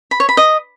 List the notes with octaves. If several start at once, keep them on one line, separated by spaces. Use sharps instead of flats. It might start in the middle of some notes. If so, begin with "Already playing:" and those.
B5
C#5
B5
D#5